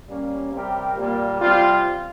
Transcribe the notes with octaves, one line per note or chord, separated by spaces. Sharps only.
G3 A#3 C#4
C3 G3 C4 G4 A#4
A#2 G3 A#3
C3 G3 C4 F4